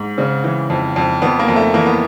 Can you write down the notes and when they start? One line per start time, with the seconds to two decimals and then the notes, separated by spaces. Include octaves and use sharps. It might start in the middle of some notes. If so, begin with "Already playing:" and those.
Already playing: G#2
0.18 C#3 C4
0.44 E3
0.70 F2
0.96 F2
1.22 F2 B3
1.39 A#3
1.48 F2
1.56 A3
1.74 E3 A#3
1.86 B3